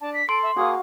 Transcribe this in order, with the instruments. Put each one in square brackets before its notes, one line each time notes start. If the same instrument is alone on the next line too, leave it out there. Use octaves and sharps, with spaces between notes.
[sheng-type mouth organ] D4 [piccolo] A5
[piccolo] B6
[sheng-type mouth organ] A4 [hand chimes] C6 [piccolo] D7
[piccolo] E5
[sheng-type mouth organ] A#3 G#4 [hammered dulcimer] F#4 F5 [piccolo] D#6